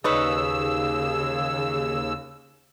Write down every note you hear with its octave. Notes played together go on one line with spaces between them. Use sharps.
D#2 C#3 D#4 G#4 B4 C#5 E6